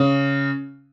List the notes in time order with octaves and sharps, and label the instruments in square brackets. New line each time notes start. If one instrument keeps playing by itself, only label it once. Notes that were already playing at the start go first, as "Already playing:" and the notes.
Already playing: [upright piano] C#3